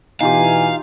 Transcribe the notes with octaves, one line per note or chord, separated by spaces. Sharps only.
B2 E3 D#4 F4 G4 F5 G#5